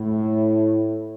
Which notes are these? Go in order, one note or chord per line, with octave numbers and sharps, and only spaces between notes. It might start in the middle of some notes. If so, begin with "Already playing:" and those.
Already playing: A2